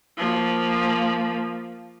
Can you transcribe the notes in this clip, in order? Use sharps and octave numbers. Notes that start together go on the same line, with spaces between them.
F3 A#3